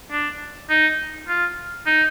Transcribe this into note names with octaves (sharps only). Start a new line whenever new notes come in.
D4
D#4
F4
D#4